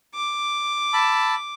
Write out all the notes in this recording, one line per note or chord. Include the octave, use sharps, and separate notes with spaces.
D6
A5 B5 E6